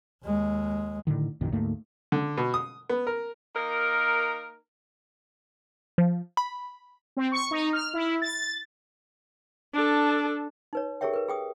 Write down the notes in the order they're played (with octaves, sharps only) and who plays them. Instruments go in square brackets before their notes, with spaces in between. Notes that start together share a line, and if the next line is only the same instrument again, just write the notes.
[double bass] D#2 G#3
[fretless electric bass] A2 D3 D#3
A#1 F#2 A#2 D#3
D2 G#2 A3 A#3
[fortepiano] D3
B2
D#6
B3
A#4
[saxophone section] A#3 D#4 A#4
[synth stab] F3
B5
[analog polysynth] C4
C#6
D#4
F6
E4
A6
[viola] D4 A4
[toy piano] D#4 B4 C#5
G4 G#4 A#4 C#5 E5 G5
A#4 B4
G#4 G5 D#6